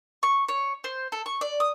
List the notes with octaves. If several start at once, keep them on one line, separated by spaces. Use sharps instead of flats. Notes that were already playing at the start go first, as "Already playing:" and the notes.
C#6
C#5
C5
A4
C#6
D5
D#6